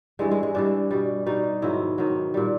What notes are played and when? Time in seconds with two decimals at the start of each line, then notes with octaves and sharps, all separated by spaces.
0.19 G2 E3 G3 G#3
0.31 G#3
0.43 G#3
0.55 G2 E3 G3 D4
0.91 B2 G3
1.26 B2 G3 D#4
1.62 G#2 D#3 F#3 E4
1.98 G#2 D#3 F#3
2.34 A#2 G3